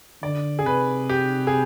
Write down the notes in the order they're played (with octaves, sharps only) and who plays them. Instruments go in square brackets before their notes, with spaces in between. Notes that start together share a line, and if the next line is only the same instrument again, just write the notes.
[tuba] D3 [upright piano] D5
[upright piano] G#4
[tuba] C3 [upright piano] B4
[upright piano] G4
G#4